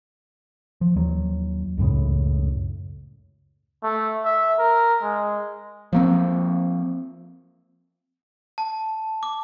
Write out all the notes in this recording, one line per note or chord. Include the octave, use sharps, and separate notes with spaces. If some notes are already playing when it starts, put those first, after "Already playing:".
F3
D#2 F#3
C#2 F#2 A2 C#3
A3
E5
A#4
G#3
F3 A#3 C4
A5
D6